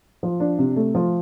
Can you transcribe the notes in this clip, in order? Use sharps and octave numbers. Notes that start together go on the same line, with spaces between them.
F3
D4
C3
A3
F3